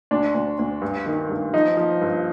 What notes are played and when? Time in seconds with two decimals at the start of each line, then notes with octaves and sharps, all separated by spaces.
0.11 D2 D4
0.35 D2
0.59 D2
0.82 G2
1.06 D#3
1.30 G2
1.53 F3 D#4
1.77 F3
2.01 G2